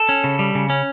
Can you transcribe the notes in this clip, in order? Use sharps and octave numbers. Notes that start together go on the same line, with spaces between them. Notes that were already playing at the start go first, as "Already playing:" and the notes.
Already playing: A4
C#4
C#3
G3
C#3
C#4